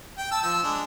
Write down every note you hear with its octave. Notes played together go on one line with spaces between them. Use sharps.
G5
A5 E6
F3 E6
G#3 D4